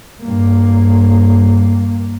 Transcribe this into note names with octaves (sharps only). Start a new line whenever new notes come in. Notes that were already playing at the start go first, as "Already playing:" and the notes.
G2 A#3